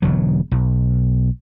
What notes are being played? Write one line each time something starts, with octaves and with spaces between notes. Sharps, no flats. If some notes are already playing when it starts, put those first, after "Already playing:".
E1 D3 F#3
B1